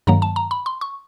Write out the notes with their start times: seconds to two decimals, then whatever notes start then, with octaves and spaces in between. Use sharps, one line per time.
0.07 G2 D#3 F#3 A#3 A#5
0.22 A5
0.36 A#5
0.51 B5
0.66 C6
0.81 C#6